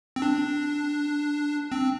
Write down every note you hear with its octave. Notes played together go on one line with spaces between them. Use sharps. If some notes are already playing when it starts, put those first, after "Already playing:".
C4
D4
C4